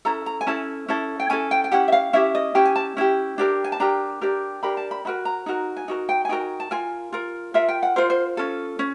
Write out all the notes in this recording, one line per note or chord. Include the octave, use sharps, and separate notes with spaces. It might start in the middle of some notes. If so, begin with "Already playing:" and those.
C#4 E4 A4 A#5
A#5
G#5
C#4 E4 A4 A5
C#4 E4 A4
G5
C#4 E4 A4 G#5
G5
G5
C#4 E4 G4 F#5
E5
F5
C#4 E4 G4 E5
D#5
C#4 E4 G4 G5
G#5
A5
C#4 E4 G4
D4 G4 A#4
G#5
A5
D4 G4 A#4 A#5
D4 G4 A#4
D4 G4 A#4 B5
A5
B5
D#4 F#4 A#4 B5
A#5
D#4 F#4 A#4
G#5
D#4 F#4 A#4
G5
G#5
D#4 F#4 A#4 G5
A5
F4 A#4 G#5
F4 A#4
F4 A#4 E5
G5
F#5
F4 A#4 C5
C5
C#4 F4 A4
C#4